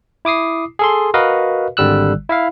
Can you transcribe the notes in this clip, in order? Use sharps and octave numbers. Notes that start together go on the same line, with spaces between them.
E4 D6 D#6 C7
G#4 A4 C6
F#4 A#4 B4 D#5 F5
G#1 D3 G3 E6 F#6
E4 E5 F5